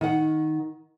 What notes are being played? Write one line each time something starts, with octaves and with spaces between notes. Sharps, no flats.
D#3 F#5